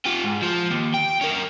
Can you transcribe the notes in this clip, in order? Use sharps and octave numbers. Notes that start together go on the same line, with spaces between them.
F4 G4
G#2
F3
D#2
G5
C#4 A#4